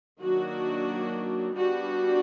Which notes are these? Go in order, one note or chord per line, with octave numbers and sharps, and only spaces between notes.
D#3 F#3 A#3 D4 F#4
G3 B3 D4 F#4